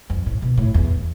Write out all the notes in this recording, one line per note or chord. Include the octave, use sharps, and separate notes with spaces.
F2
A2
B2
A2
E2